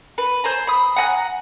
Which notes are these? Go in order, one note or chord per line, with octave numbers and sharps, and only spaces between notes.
B4
C5 G#5 A#5
B5 D#6
F#5 G#5 A#5 F#6